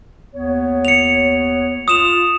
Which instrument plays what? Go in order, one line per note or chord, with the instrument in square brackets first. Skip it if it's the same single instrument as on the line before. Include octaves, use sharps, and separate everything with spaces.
[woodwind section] D#2 B3 C#5
[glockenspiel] C#7 F7
[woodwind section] F4 [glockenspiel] D#6 E7 F7